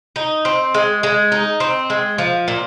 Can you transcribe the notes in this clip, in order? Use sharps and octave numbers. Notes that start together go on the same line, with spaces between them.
D#4
C4
G#3
G#3
D#4
C4
G#3
F3
A#2